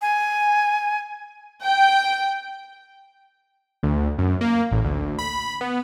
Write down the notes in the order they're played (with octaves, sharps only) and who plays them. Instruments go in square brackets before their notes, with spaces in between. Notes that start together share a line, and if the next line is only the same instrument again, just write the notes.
[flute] G#5
[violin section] G5
[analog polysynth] D2
F#2
A#3
A1
D2
B5
B3